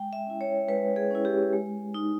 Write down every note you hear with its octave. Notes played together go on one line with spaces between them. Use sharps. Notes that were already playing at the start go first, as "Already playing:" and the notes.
Already playing: G#3 G5
E5
C#4 E4
C#5
G#3 B4
G#4
C#4 E4
G4
G#3
D#4